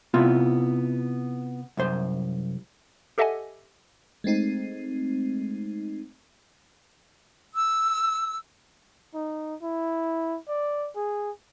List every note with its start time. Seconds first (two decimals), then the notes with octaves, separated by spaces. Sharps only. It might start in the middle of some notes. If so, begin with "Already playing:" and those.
0.14 C3 B3 C4 E4 F4
1.77 C2 F#2 C5
3.18 G4 A4 D#5 E5 F#5 G#5
4.24 G#3 A3 C4 D#4
7.54 E6
9.14 D#4
9.62 E4
10.48 D5
10.95 G#4